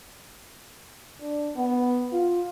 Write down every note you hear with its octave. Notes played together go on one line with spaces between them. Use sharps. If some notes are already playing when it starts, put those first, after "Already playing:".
D4
B3
F4